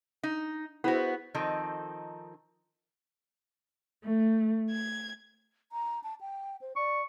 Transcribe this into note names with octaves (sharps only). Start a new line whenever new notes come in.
D#4
B3 E4 F#4 G#4 C5
D#3 F3 C4 D#4 A4
A3
G#6
A#5
A5
G5
C5
D5 C#6